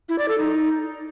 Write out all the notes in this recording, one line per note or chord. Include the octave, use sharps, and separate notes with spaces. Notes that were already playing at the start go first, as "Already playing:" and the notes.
E4
D5
A4
D#4